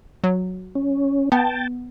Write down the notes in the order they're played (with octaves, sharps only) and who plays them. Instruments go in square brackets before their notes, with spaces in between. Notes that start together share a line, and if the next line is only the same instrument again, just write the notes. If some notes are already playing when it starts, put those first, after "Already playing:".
[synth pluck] F#3
[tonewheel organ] C#4
[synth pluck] B3 [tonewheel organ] G5 A5